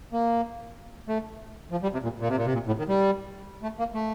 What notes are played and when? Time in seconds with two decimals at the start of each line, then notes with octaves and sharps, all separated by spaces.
0.13 A#3
1.08 A3
1.71 F3
1.83 G3
1.93 C3
2.03 A#2
2.20 A#2
2.28 C3
2.37 A#2
2.45 C3
2.53 A#2
2.67 A2
2.78 D#3
2.89 G3
3.63 A3
3.79 A#3
3.94 A3